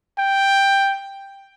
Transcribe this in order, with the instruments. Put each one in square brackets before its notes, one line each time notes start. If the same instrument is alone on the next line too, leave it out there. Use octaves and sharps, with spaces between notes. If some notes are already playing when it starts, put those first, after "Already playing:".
[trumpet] G5